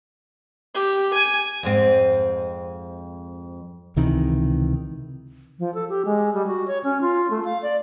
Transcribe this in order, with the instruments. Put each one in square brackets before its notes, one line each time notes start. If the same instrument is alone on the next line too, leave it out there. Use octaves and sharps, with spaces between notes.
[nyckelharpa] G4
G#5
[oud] F2 G#2 C4
[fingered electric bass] C#2 C3 D#3 E3
[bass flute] F3
A4
G4
G#3
G3
F#4
C#5
C#4
F4
A3
F5
D5